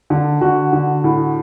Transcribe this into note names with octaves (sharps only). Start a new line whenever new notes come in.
D3
D3 F#4
D3
A2